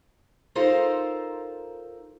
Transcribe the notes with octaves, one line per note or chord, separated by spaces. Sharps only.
D#4 F4 A4 A#4 C5 F5